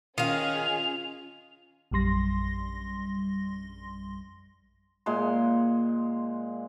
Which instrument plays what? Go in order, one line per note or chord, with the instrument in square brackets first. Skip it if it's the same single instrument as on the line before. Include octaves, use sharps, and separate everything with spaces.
[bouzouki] D#3 F5 [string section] C#4 G#4 [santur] F4 [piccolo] F7
[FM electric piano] A#1 F#2 G3 C6 A#6
[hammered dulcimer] A#2 G#3 C6